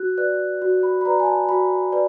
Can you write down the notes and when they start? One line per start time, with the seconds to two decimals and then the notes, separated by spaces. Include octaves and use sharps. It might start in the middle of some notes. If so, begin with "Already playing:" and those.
Already playing: F#4 F#6
0.17 B4 D5 F#6
0.62 F#4
0.83 B5
1.01 B5
1.05 B4 D5 A#5
1.20 G#5
1.26 A5
1.48 F#4 B5
1.92 B4 D5